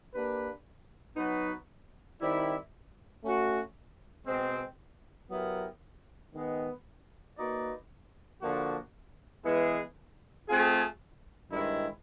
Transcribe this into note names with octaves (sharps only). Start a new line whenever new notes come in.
A#3 D4 G4 B4
F#3 B3 D#4 F#4 B4
D#3 G3 C4 E4
A3 C#4 F#4
B2 G#3 C4
F#3 B3 E4 G4 A#4
D#3 G#3 B3
A#3 D#4 F#4 B4 D5
D3 F3 A#3 D4 F#4
E3 G#3 B3 E4 G#4
A3 C4 F4 G#4
G2 D#3 G#3 C4 E4